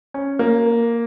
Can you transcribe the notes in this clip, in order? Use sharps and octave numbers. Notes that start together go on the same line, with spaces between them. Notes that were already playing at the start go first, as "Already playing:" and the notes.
C#4
A#3